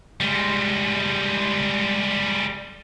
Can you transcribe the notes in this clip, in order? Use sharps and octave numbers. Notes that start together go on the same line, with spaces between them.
G3 G#3